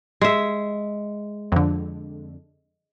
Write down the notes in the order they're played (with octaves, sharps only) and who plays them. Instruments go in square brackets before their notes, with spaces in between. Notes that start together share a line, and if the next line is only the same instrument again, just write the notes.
[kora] G#3 E5
[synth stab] F2 D3